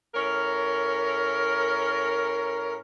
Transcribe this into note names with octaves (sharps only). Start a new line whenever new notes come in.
A2 C#4 A#4